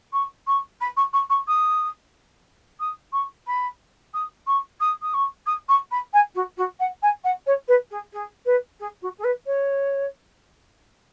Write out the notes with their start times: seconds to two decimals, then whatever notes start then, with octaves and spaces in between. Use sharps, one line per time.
0.13 C#6
0.47 C#6
0.80 B5
0.97 C#6
1.13 C#6
1.30 C#6
1.47 D#6
2.80 D#6
3.13 C#6
3.47 B5
4.13 D#6
4.47 C#6
4.80 D#6
5.02 D#6
5.14 C#6
5.46 D#6
5.69 C#6
5.91 B5
6.13 G#5
6.35 F#4
6.57 F#4
6.79 F#5
7.02 G#5
7.24 F#5
7.46 C#5
7.68 B4
7.91 G#4
8.13 G#4
8.45 B4
8.80 G#4
9.02 F#4
9.18 G#4
9.24 B4
9.46 C#5